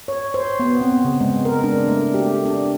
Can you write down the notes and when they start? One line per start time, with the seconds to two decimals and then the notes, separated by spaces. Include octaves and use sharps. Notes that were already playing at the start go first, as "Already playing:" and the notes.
0.08 C#5
0.34 C5
0.60 B3
0.81 C4
1.05 C#3
1.20 G#3
1.45 A#4
1.64 D4
1.88 A3
2.14 G4
2.46 D4